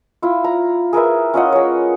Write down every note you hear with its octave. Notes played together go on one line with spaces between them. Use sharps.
E4 F4
A#5
G#4 A#4 B4 E5
C#4 F4 D#5 F#5
G#3 C#5